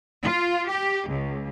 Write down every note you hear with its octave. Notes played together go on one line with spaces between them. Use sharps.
F4
G4
C#2